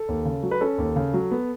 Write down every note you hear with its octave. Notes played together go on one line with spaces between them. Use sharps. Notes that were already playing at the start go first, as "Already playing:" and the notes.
Already playing: A4
D#2
C#3
F#3
B4
C#4 A4
D#2
C#3
F#3
B3